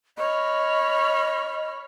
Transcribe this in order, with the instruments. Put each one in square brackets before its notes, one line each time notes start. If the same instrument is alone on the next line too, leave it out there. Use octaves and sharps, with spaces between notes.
[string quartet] C#5 B5 F6 [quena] D#5